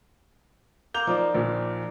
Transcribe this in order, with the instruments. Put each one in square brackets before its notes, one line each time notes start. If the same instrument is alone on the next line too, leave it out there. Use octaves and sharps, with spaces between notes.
[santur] A#3 [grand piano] G6 F7
[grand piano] F3 [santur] D#4 D5
[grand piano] A#1 A#2